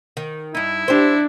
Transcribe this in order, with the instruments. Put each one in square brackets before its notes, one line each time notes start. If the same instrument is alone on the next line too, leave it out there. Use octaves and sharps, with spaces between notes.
[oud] D#3
[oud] G2 D#4 [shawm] E4
[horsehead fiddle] D4 [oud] G4 C5